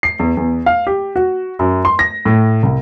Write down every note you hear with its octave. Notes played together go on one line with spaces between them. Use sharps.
C7
E2
E2
F5
G4
F#4
F#2
C6
A#6
A2
C2